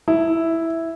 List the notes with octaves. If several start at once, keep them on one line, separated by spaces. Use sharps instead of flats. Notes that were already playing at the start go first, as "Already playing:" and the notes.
E4